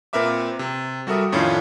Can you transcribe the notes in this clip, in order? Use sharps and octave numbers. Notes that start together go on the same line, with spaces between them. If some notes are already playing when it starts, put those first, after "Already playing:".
A#2 C4 A#4 B4 E5 D6
C3
G3 F#4 A4 A#4 E5 D#6
F2 A2 D#3 C#4 D4 F4